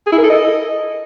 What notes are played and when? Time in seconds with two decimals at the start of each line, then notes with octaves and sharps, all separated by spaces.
0.07 G#4
0.12 E4
0.18 A#4
0.24 A4
0.30 D#5